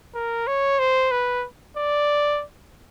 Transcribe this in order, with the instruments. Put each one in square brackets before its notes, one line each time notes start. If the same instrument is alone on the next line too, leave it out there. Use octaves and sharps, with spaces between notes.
[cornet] A#4
C#5
C5
B4
D5